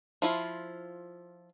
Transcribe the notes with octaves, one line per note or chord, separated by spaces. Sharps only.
F3 E4 F4